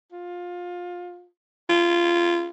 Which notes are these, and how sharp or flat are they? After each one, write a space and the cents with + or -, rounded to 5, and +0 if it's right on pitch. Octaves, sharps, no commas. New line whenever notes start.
F4 +20
F4 -20